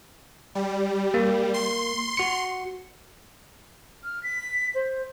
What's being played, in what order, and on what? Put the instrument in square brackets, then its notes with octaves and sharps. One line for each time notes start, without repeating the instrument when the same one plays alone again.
[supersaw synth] G3
[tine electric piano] A#3
[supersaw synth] C6
[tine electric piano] F#4 C#7
[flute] F6
B6
C5